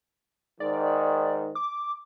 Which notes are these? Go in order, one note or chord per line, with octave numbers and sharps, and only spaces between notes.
G#2 D#3 D5
D6